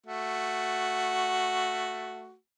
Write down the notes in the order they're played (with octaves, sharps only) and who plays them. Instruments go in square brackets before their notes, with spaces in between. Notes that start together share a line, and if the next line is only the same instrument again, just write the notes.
[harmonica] A3 F#4